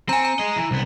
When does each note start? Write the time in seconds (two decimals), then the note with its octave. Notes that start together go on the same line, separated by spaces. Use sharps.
0.09 C4 G#5 A#5
0.25 A#5
0.39 G#4 D#5
0.56 E3
0.71 C2 B3